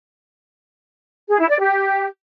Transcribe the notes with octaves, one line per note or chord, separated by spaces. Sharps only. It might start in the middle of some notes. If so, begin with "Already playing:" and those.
G#4
E4
D5
G4